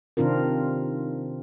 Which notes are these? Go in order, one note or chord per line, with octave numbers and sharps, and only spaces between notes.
C3 D#3 C4 D4 F4 A#4